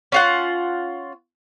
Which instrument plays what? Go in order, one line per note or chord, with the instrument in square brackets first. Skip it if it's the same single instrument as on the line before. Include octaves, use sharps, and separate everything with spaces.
[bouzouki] C#4 F4 F#5